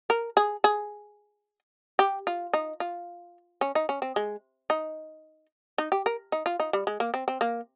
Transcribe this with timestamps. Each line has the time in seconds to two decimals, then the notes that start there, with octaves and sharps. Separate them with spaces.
0.10 A#4
0.37 G#4
0.64 G#4
1.99 G4
2.27 F4
2.53 D#4
2.80 F4
3.61 C#4
3.75 D#4
3.89 C#4
4.02 C4
4.16 G#3
4.70 D#4
5.78 D#4
5.92 G4
6.06 A#4
6.32 D#4
6.46 F4
6.60 D#4
6.73 G3
6.87 G#3
7.00 A#3
7.14 C4
7.28 C4
7.41 A#3